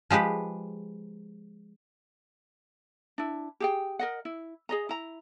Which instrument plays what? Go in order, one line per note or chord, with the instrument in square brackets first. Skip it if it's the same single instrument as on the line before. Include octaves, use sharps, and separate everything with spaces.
[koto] F3 G#3 G4 B4
[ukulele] D4 E4
G4 G#4 G5
A#4 D#5 F#5
E4
G#4 D#5 A#5
E4 A#5